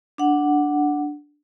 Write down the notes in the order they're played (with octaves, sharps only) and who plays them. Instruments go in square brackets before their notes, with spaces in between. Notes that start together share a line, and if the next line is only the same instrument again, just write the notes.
[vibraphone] D4 F#5